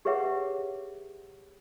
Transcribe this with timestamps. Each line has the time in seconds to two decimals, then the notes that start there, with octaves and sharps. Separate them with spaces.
0.05 G4 G#4 B4 C#5 E5 F#5